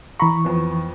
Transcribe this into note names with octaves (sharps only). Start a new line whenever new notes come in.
E3 A#5 B5 C#6
F2 B3